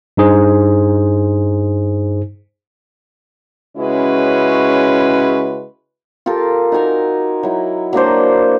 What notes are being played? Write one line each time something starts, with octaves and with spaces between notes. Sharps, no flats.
G2 D#4 G#4 C5
C#3 G#3 C#4 E4 F#4 B4
F4 G4 A4 A#4
D#4 F#4 G#5 A#5
F#3 E4
F#3 A#3 D4 C5